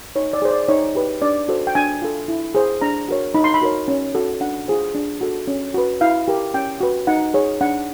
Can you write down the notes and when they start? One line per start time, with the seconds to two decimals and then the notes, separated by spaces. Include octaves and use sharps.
0.15 D#4 C#5
0.33 D5
0.42 G#4 C5
0.51 D5
0.68 D#4 C#5
0.95 G4 B4
1.22 D4 D5
1.48 F#4 A4 C5
1.67 G5
1.75 D4 G#5
2.02 F4 A4
2.28 E4
2.55 G#4 C5
2.81 D4 A#5
3.08 F#4 A#4 C#5
3.34 D#4 B5
3.44 C6
3.54 B5
3.61 F#4 A#4 C#5
3.88 C#4
4.15 F#4 A4
4.41 D4 F#5
4.68 F4 G#4 C5
4.95 D4
5.21 F#4 A4
5.47 C#4
5.74 F#4 B4
6.01 E4 F5
6.28 G4 A#4
6.54 C#4 G5
6.80 F#4 B4
7.07 D#4 F#5
7.34 G#4 C#5
7.61 D4 F#5